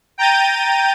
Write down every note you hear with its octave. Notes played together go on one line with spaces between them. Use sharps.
G5 A#5 G6 A6 D#7